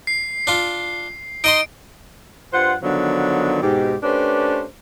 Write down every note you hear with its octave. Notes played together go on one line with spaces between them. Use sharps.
C7
D4 F4
D#4 D#5 C6 D7
G2 F4 C5 F#5
D3 D#3 F3 F#3 B3
G#2 B2 G4
A3 C#4 D4 G4 B4 C5